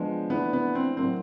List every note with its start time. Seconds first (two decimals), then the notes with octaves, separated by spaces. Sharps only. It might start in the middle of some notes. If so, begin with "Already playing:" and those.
Already playing: F3 G#3 B3 D4
0.30 E3 A3 B3 D4
0.53 B3
0.75 C4
0.97 A2 F#3 A#3 C4